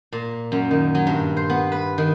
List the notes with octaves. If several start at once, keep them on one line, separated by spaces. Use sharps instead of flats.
A#2
F#2
D#3
F#3
G2
C5
B3
B4
D#3